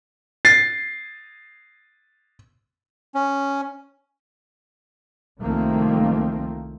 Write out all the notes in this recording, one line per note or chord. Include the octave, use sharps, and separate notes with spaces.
A6 C7
C#4
C2 D#3 F3 A3 A#3 C4